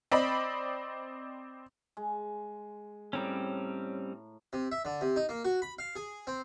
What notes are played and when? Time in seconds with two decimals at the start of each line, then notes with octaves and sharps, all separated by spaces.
0.11 C4 D5 D#5 B5
1.97 G#3
3.13 A2 G3 C4 C#4 A#5
4.53 C3
4.72 E5
4.85 D3
5.01 C3
5.16 D#4
5.29 A#3
5.45 F#4
5.62 B5
5.79 F5
5.96 G#4
6.27 C4